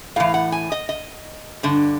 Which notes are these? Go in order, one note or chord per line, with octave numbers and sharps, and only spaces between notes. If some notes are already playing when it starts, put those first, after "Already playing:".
A2 E3 F5
F#5
G#5
D#5
D#5
G2 D3